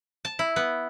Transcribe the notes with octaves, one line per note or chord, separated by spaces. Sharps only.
A5
E4
B3